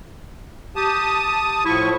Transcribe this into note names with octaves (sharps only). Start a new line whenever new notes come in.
G4 A5 D#6
A2 F3 E4 C#6